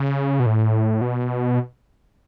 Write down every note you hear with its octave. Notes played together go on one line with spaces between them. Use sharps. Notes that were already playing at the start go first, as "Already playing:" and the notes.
Already playing: C#3
B2
A2
B2